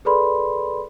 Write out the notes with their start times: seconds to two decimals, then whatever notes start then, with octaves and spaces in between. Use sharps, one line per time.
0.05 G#4 A4 B4 D5 B5 C6